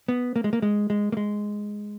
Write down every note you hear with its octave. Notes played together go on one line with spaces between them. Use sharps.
B3
A#3
G#3
A#3
G#3
G#3
A#3
G#3